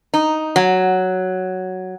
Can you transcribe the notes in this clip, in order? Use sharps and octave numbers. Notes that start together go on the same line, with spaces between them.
D#4
F#3